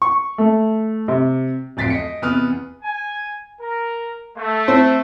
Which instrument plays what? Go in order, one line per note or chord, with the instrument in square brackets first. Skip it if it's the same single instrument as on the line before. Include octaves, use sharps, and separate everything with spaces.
[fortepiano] C#6
A3
C3
[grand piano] D1 F2 A6 B6 C7 D7
D#5 B6 C#7
E2 C3 B4 D#6 F6
[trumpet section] G#5
A#4
A3
[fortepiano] C4